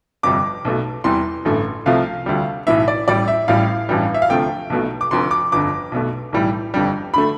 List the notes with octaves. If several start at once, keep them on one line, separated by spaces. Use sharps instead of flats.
G1 F2 C3 G3 D6
B1 B2 A3
E2 C3 E3 G3 C6
A1 G2 D3 A3
C2 C3 F3 A3 F5
D2 D3 G3
B1 A2 E3 E5
D5
A1 A2 G3 D5
E5
A1 A2 G3 F5
A1 G2 E3 G3
E5
F5
D2 C3 F3 A3 G5
B1 B2 A3
D6
F1 F2 D3 C6
D6
G1 F2 D3 D6
B1 B2 A3
B1 A2 E3 G3
G1 F2 D3 G3
D3 A3 B5